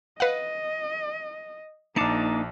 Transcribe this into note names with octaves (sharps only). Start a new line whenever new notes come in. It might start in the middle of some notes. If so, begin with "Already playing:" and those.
B4 D#5 F5 F#5
A#1 A#3 D4 D#4 A5 D6 C7 C#7